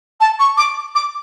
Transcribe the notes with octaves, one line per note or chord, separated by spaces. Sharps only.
A5
C#6
D6
D6